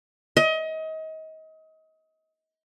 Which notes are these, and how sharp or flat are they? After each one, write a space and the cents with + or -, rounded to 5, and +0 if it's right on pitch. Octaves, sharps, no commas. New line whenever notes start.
D#5 +30